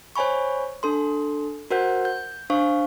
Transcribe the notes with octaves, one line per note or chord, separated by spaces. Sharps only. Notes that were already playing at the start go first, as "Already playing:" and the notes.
C5 C#5 G#5 B5 C#6
D4 A4 C6
F#4 A#4 C5 F#5 G6
G6
D4 C5 F5 C#6